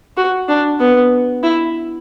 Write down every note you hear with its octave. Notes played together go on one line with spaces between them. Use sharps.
F#4
D4
B3
E4